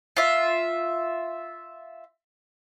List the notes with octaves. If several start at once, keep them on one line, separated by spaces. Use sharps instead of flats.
F4 E5